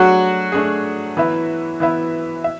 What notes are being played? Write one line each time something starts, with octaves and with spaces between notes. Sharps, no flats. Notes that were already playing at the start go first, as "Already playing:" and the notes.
Already playing: F#3 A3 D4 F#4 G#4
A3 D4 G#4
E3 B3 E4 B4 E5
E3 B3 E4 B4 E5
E5